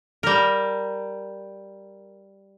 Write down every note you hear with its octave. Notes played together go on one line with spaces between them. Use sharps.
G3 A#4